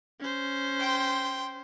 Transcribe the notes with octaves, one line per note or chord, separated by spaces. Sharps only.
C#4 C5
G5 C6